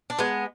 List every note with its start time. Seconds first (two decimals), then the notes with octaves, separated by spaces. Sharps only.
0.10 D4
0.19 G#3 B3